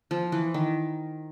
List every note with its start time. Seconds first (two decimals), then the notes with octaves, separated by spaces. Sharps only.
0.11 F3
0.32 E3
0.54 D#3